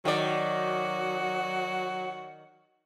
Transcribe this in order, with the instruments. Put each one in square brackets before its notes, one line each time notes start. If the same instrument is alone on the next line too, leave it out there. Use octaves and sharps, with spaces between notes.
[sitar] D#3 D5 [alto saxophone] F#3 [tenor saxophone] F#4